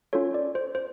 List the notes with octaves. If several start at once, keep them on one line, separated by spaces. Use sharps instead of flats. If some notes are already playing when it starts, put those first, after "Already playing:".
C#4 F4 A4 C#5
D5
C5
C5